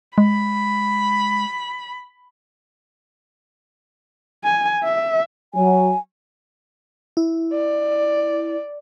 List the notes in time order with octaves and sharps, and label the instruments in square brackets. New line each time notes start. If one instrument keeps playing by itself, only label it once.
[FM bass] G#3 [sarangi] B5
[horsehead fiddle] G#5
E5
[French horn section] F#3 [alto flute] G#5
[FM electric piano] E4
[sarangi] D5